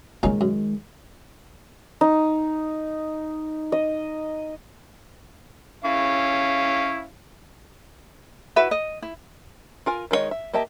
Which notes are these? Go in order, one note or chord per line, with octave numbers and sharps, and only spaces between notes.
A#2 D#3 G#3 C#4 D#4
F#2
D#4
D#5
C#4 E4 F5
E4 F#4 B4 E5
D#5
E4
F4 A#4 G#5
D#3 G#3 C4 C#5 D#5
E5
A#3 G4 D#5 E5 A5